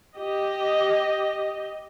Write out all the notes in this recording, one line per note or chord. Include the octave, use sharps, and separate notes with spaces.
G4 D#5